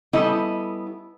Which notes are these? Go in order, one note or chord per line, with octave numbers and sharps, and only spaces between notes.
G3 B3 C#4 E4 A4 D#5